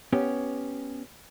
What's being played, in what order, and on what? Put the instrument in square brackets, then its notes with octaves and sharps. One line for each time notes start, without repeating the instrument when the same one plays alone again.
[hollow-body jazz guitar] B3 C#4 G4